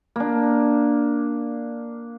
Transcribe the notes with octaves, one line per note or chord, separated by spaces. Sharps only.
A#3 D4